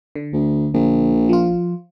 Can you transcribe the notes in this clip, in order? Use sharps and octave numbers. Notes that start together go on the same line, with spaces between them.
D3
D2
A#1
F3 F4